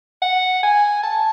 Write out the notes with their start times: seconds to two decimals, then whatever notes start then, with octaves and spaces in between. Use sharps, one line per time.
0.22 F#5
0.63 G#5
1.03 A5